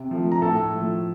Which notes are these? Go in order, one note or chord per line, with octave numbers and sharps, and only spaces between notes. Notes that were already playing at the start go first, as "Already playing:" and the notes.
Already playing: C3
F3 A3
A#5
A2 A4 A5
F3 A3